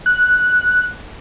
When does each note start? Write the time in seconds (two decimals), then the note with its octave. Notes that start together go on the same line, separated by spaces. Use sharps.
0.06 F#6